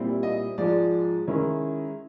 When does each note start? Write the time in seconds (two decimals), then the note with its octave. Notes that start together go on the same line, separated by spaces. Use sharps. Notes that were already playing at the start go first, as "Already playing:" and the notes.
Already playing: A#2 G3 C4 E4
0.23 D#5
0.58 G#2 F3 G#3 D5
1.28 D#3 G#3 C#4 E4